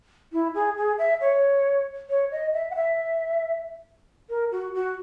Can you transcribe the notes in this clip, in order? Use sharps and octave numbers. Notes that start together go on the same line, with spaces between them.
E4
G#4
G#4
E5
C#5
C#5
D#5
E5
F#5
E5
A#4
F#4
F#4